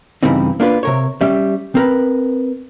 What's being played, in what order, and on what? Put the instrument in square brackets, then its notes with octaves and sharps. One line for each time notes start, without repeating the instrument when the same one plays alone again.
[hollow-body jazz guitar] G2 C#3 E3 G3 C4 D#4
A#3 D4 F4 B4
C3 A#4 C#5
G3 C#4 E5
C4 A#4 B4